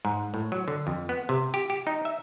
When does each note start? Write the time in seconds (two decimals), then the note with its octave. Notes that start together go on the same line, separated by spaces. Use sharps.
0.05 G#2
0.34 A2
0.52 F#3
0.68 D3
0.87 F2
1.09 B3
1.29 C3
1.54 G4
1.70 G4
1.87 D#4
2.05 E5